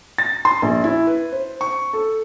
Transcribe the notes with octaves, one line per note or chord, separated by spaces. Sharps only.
A6
C6
A#1
E4
B4
C5
C#6
A4